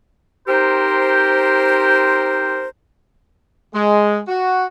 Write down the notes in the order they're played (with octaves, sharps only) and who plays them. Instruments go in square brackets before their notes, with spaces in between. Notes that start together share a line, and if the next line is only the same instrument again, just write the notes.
[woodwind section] C4 D#4 G4 A#4 C5
[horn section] G#3
F#4